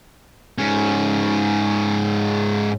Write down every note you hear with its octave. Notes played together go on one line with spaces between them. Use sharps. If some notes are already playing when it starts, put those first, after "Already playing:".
G#2 C#4